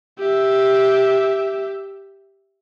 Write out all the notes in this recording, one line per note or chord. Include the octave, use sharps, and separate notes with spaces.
G4 E5